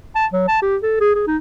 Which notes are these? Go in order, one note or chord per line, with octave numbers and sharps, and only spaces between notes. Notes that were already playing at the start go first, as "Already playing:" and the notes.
A5
F#3
A5
G4
A4
G#4
G#4
D#4